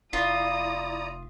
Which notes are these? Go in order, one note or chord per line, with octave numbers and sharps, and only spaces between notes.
F1 E4 F4 D5 A#5 D#6